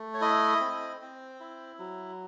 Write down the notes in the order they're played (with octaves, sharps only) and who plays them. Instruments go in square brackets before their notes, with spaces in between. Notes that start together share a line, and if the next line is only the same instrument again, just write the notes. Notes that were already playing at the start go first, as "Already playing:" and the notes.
Already playing: [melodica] A3
C#5
E4 D#5
C4
C4
E4
F#3